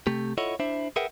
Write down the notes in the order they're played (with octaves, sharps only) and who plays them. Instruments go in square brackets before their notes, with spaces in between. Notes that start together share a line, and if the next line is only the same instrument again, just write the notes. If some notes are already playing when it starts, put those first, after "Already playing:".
[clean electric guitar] C3 A3 G4
E4 F4 A4 C#5 D#5 F#5
D4 E4 C5 E5
G#4 A#4 B4 E5 F#5 G5